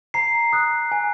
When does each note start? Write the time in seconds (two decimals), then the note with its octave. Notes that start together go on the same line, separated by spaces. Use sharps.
0.14 A#5 C7
0.53 D#6 F#6
0.92 G#5